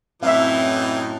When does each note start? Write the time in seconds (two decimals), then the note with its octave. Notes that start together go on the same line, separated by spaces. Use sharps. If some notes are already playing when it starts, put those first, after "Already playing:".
0.23 F#2 A2 E3 C4 D#4 E5 F5